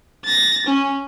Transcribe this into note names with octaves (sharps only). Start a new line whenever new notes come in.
A6 A#6
C#4